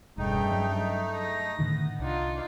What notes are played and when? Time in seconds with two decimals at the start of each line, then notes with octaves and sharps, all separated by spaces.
0.18 E1 G2 C#3 A3 D#4 G5
0.51 F#3
1.15 A#6
1.59 A2 D3 D#3 B3
1.99 C2 D4 D#4 F4